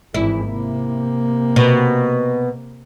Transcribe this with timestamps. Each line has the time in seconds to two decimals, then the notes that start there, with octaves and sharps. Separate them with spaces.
0.14 G#1 E3 E4
0.47 C3 A#3
1.56 B2